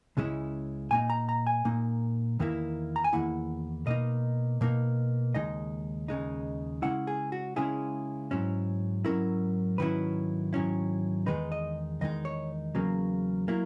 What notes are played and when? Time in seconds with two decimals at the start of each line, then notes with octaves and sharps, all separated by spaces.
0.17 C#2 C#3 G#3 C#4 E4
0.91 A#2 A#3 D#4 G#5
1.10 A#5
1.29 A#5
1.47 G#5
1.65 A#2 A#3 D#4
2.39 E2 D#3 A#3 E4
2.96 A#5
3.04 G#5
3.13 E2 D#3 A#3 E4 F#5
3.86 B2 A#3 D#4 D#5
4.61 B2 A#3 D#4
5.35 D#2 C#3 G#3 D#4 D#5
6.08 D#2 C#3 G#3 D#4
6.82 C#3 G#3 C#4 E4 F#5
7.07 G#4
7.32 F#4
7.56 C#3 G#3 C#4 E4 G#4
8.31 G#2 F#3 C#4 E4
9.05 G#2 F#3 C#4 E4 A#4
9.78 G#2 D#3 F#3 C#4 E4 B4
10.53 G#2 D#3 F#3 C#4 E4
11.26 E2 D#3 G#3 D#4 B4
11.52 D#5
12.01 E2 D#3 G#3 D#4 D#5
12.25 C#5
12.75 E2 C#3 F#3 A#3
13.48 F#3 A#3 E4